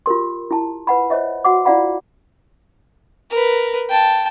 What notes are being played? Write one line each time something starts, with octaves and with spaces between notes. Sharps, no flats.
F4 G4 A#4 C6
E4 A5
B4 F#5 B5
C5 C#5 D#5 E5
F#4 F#5 D6
E4 F4 D5 F5 F#5 B5
A#4 B4
G5 A5